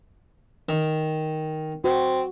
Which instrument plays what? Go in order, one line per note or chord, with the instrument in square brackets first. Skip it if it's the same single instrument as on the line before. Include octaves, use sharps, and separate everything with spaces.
[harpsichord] D#3
[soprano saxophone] C4 [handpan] F#4